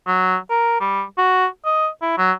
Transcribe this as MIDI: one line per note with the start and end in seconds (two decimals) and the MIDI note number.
0.07 0.36 54
0.50 0.77 70
0.80 1.03 55
1.18 1.46 66
1.65 1.88 75
2.02 2.15 64
2.18 2.32 54